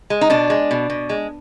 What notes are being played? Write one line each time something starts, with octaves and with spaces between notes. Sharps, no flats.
G#3
D#4
B2 D4
G#3
B2
B2
G#3